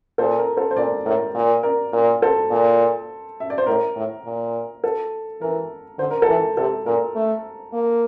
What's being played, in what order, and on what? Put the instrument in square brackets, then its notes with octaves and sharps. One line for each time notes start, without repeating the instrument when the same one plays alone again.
[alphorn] A#2 [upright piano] A4 C5
[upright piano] A#4
A4 C5
C5
[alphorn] A#2 [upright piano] A#4 D5
[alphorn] A2 [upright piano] A#4
[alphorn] A#2
[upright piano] A#4 D5
[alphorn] A#2 [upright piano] A#4
[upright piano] A4 C5
[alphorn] A#2
[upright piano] E5
D5
C5
[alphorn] A2 [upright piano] A#4
[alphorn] A2
A#2
[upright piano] A4
[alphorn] E3 [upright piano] A#4
[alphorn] D3 [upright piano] C5
[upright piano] A#4
A4
[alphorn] E3
[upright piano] A#4
[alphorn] C3 [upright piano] A4
[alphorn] A#2 [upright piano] A#4
[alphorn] A3
A#3